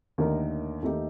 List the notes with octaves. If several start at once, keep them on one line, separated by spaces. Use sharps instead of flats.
D#2 D3 A3 D#4 A#4
D#2 D#3 A3 D#4 G4